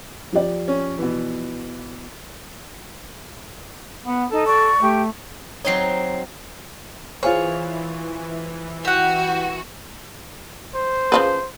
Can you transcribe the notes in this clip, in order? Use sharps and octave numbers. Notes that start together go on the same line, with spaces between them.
F3 G4 D5
C#4
B2 E3
B3 F#5
D#4 A4
D5 C#6
A3 G4
F#3 C4 D#4 C#5 C7
E3 F4 G#4 C5 C#5
F#4 G4 F#5
C5
C#3 F3 B4